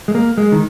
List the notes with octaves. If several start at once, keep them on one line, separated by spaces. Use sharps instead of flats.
G#3
A#3
G#3
D#3